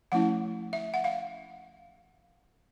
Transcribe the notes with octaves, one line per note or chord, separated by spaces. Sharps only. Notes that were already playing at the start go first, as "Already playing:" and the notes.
F3 A3 C#4 E4 F#5
E5
F#5
F5